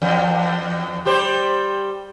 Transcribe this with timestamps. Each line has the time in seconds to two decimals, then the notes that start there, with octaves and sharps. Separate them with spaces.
0.02 E2
1.05 G3 G4 C5